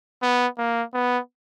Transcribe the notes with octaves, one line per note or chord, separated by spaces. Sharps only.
B3
A#3
B3